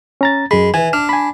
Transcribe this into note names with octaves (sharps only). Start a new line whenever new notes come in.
C#4 A#5 A6
F#2 G#3 B5
E3 G#5
D4 F6
G#5 B5